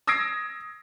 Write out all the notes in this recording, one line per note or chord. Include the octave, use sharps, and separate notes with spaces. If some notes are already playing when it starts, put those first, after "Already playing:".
D#6 E6 G#6 A#6 C7 D7